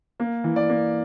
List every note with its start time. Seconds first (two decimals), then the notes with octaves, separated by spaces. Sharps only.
0.20 A#3
0.44 E3
0.56 D5
0.69 A#3